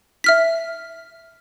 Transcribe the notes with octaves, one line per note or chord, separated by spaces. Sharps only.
E5 F6 B6